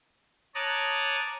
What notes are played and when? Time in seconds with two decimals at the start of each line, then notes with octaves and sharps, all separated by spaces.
0.55 C#5 A5 A#5 D6 D#6 F#6